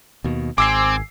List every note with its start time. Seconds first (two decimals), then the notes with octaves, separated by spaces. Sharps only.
0.24 D#2 B2
0.58 G#1 C4 G#5 D6 E6 C7